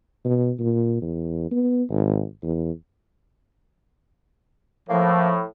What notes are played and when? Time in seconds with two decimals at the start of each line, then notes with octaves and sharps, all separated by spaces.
0.25 B2
0.59 A#2
1.02 E2
1.51 B3
1.90 G#1
2.43 E2
4.89 A2 F3 A#3